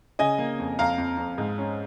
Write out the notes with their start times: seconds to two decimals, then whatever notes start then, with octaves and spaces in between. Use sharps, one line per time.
0.19 C#3 D#5 G#5
0.38 A#3
0.59 F2
0.79 F2 F5 A#5
0.98 F2
1.18 F2
1.38 G#2
1.58 C#4